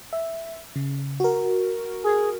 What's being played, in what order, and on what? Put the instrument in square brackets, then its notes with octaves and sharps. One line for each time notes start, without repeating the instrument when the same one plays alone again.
[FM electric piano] E5
C#3
F#4 A#4
[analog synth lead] G#4